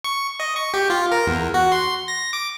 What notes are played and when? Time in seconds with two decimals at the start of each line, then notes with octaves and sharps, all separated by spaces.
0.04 C#6
0.40 D#5
0.56 C#6
0.74 G4
0.90 F4
1.11 A#4
1.27 E2
1.54 F#4
1.72 C6
2.08 A#6
2.33 D6